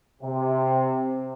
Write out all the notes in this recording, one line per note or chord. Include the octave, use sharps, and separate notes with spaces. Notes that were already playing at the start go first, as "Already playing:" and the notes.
C3